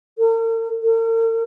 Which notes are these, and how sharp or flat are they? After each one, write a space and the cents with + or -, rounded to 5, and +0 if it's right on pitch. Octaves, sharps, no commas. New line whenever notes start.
A#4 -45
A#4 -45